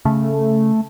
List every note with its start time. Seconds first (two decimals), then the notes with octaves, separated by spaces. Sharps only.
0.05 C#3 A3